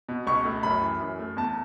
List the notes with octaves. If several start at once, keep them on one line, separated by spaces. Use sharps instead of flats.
B2
C#2 C#6
A3
F#2 B5
E3
F#2
A3
E2 A5